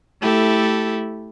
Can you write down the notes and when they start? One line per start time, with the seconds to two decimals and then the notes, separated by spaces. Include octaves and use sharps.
0.20 A3 E4 G4 A4